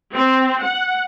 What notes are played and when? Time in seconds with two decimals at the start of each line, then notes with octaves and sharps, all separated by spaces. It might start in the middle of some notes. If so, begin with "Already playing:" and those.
0.15 C4
0.63 F#5